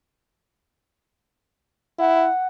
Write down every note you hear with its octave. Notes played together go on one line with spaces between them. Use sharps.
E4 F#5